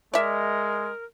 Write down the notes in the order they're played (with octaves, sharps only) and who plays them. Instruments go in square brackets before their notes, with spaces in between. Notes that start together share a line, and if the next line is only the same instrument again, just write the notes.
[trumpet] G#3 [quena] A#4 [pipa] D5 E5